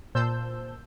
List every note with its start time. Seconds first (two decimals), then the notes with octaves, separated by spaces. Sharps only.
0.15 A#2 C5 A5 E6 G6